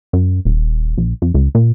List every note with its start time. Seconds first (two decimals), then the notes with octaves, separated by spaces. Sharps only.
0.13 F#2
0.45 D#1
0.98 A#1
1.22 F2
1.34 C#2
1.55 A#2